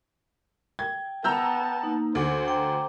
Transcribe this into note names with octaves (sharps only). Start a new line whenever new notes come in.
G5 G#6
B3 A5 A#5 E6 G6
A#3 D#4
D2 C5 D6
G5 A#5 D6